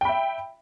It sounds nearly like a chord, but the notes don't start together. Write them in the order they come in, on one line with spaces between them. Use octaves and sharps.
G5 B5 E5